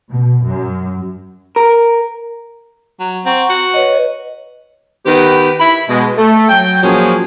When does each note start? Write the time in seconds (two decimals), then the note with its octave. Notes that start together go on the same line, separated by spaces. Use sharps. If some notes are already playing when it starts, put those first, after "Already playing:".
0.10 B2
0.44 F#2
1.56 A#4
3.00 F#3
3.25 C4 F#5 A#5 C#6
3.49 F#4
3.74 B4 C#5 D#5
5.05 D#3 B3 G4 B4
5.59 E4 B5
5.88 B2 G#3
6.17 A3
6.49 F#3 G5
6.83 A#2 F3 F#3 C#4 G#4